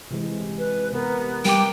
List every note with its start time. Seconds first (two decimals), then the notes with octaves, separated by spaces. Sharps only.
0.11 C3 E3 G#3
0.58 B4
0.92 C3 B3 A#4
1.45 G3 A#4 G5 D6